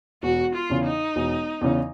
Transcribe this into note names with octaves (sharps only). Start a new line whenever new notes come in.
E1 F#4
F4
E2 C#3
D#4
E1
E2 C#3